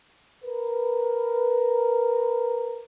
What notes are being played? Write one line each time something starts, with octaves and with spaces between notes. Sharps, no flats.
A#4 B4